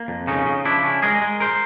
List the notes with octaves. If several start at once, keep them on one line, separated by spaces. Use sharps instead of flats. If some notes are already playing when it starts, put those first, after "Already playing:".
Already playing: A#3
F2
C#3 C#4 D#4
C#3
F3 D4 E4
C#4
G#3 G#4 A#4
G#3
A#4 C5